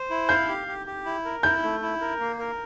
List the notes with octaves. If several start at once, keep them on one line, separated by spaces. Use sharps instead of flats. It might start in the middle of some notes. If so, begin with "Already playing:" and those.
Already playing: C5
E4
F5 G6
G4
G4
G4
E4
A#4
E4 G6
A3
E4
A#4
A#3
A#4